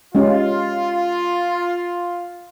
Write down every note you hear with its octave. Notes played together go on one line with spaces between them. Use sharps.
G#3 C#4 F4 G4